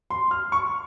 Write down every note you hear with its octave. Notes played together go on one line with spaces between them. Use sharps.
C6
F6
C#6